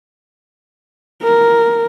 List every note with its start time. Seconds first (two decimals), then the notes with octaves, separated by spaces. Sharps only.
1.23 A#4